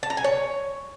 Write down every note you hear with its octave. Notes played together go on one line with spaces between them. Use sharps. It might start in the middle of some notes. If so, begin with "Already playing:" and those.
A5
A#5
G#5
C#5